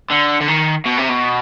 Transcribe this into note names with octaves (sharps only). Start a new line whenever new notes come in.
D3
D3
D#3
B2
C3
B2